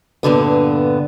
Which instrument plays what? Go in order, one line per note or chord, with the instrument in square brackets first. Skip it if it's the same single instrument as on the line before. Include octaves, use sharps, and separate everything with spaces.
[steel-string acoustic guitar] G2 A#2 D3 B3